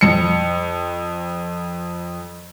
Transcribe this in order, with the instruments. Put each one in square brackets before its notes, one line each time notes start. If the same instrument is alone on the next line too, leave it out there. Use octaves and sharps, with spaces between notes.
[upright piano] F2 C#7